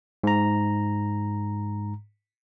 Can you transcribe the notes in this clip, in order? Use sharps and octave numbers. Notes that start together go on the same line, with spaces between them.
G#2 A#5